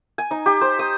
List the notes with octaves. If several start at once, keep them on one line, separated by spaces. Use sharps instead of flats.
G#5
D#4
G4
C5
D#6